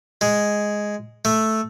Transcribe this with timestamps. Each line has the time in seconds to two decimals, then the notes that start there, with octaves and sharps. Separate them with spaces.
0.21 G#3
1.25 A3